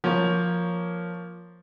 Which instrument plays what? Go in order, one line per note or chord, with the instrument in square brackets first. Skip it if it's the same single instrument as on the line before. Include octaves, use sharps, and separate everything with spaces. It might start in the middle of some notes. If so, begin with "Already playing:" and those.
[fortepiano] F3 A#3 C#5